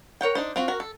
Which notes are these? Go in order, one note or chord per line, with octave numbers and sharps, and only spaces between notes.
A#4 C#5 F#5 G5
D4 D#4 C5
C4 F4 F#4
F#4 A#4
A4